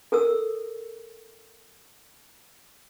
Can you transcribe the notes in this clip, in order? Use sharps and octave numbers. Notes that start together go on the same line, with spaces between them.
A4 A#4 E6